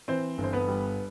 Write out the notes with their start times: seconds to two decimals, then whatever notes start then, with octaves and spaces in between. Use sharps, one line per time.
0.08 E3 C4 C5
0.38 G1
0.44 C5
0.53 B3 B4
0.68 G3